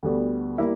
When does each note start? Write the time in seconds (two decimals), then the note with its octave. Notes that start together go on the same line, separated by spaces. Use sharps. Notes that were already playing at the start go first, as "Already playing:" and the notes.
0.03 D2 D3 G3 B3 F#4
0.58 G3 A#3 E4